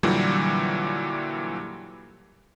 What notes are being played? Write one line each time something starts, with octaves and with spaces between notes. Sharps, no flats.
A#2 D3 E3 F#3 G3